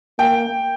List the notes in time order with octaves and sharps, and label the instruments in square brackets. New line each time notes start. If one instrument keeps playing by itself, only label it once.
[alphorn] A#3 [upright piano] G5